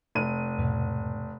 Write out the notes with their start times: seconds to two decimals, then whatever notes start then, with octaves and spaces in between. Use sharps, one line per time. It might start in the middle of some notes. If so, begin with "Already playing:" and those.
0.15 F1 D#7
0.58 E2 G#2 B2